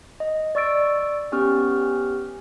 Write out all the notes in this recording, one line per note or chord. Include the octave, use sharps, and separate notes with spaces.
D#5
D5 C#6 E6 A6 D7
B3 C#4 G4 C#6 F6